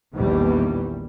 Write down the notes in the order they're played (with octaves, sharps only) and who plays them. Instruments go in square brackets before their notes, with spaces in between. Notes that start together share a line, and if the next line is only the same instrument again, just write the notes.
[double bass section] A#1 E2 D#3 E3 G3